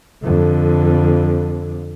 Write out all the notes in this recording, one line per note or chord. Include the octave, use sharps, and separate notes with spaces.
F2 D3